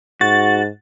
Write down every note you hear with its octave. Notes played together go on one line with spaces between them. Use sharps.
G#2 F#4 A6